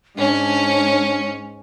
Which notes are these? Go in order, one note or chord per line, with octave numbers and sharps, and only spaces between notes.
G#2 C#4 D4